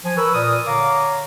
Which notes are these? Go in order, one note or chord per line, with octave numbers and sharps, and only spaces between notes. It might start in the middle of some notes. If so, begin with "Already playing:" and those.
F3 G#5
A#4 B4 B5 C#6 E6
A#2 A#4 D5 D#6
D3 C#5 F5 A#5 D6